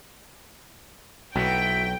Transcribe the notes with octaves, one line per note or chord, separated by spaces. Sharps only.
B1 B3 E4 F#4 G5